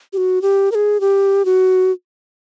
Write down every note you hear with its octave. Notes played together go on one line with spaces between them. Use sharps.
G4
F#4
G4
A#4
G#4
G4
F#4